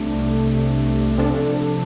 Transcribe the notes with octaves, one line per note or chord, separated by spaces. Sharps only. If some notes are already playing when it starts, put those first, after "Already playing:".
Already playing: C2 C3 A3 D4
C3 F3 D4 A4